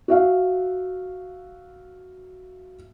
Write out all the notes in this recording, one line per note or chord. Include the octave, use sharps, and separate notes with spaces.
F#4 E5 F5